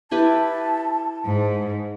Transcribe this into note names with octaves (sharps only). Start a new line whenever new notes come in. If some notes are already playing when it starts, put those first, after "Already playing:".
E4 G4 B4 A5
G#2